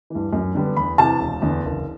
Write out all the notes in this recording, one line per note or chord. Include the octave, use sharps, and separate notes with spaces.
G2 E3
F#2
D3 G3 B3
E2 B5
C3 E3 A5
E1
E2 D3
F#1